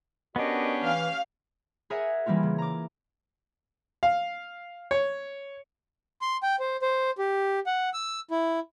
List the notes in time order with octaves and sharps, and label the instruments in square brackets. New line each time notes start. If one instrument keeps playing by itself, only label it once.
[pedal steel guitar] B3 D4 [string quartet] C#4 G4 [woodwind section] F#4 A#4 D#5
[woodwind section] E3 [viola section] F5
[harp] G#4 A#4 C#5 E5 F#5 G#5
E3 G3 A#3 C#4 F4
C#3
A#5 D6
[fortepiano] F5
C#5
[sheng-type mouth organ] C6
G5
C5
C5
G4
F#5
E6
E4